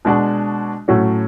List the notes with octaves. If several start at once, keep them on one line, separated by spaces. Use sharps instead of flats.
B2 G#3 D4 F#4
A2 F#3 A3 C#4 F#4